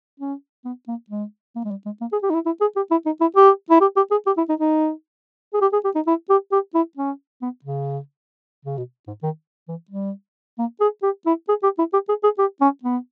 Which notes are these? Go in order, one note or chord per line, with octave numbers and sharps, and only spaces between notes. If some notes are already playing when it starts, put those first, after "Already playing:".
C#4
B3
A#3
G#3
A#3
G#3
G3
G#3
A#3
G#4
G4
D#4
E4
E4
G#4
G4
E4
D#4
E4
G4
E4
G4
G4
G#4
G4
E4
D#4
D#4
G#4
G4
G#4
G4
D#4
E4
G4
G4
E4
C#4
B3
C#3
C#3
B2
G#2
D#3
E3
G3
A#3
G#4
G4
E4
G#4
G4
E4
G4
G#4
G#4
G4
C#4
B3